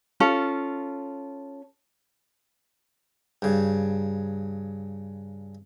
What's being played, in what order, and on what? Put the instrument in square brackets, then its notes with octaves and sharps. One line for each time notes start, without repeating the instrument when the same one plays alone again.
[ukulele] C#4 F4 A4
[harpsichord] G2 C#3